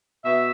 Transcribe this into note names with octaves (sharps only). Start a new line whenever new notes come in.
B2 B3 E5